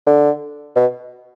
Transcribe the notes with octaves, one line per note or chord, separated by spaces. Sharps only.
D3
B2